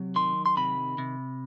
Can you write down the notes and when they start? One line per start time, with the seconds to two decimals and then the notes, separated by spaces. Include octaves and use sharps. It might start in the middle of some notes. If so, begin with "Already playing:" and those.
Already playing: C3 F#3
0.16 D#3 C6
0.46 C6
0.57 C3 B5
0.98 C3